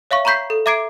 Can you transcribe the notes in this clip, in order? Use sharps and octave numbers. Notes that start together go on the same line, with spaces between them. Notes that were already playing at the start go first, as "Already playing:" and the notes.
C#5 E5 F5 C#6
A#5 B5 C#6 G6 B6 C7
A4
E5 A#5 D6 G#6 C7 D7